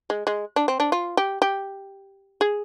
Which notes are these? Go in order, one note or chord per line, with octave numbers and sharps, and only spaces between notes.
G#3
G#3
D4
C4
D4
F4
G4
G4
G#4